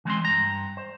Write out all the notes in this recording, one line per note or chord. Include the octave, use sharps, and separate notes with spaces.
E3 G#3 C4 C6
G2 A#5
C5